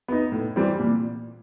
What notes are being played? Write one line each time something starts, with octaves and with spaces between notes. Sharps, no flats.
B3 D#4
A2
E3 G3 C4
A#2